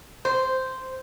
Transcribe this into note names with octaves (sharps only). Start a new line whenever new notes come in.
C5